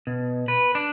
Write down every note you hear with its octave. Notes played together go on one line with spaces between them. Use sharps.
B2
B4
D4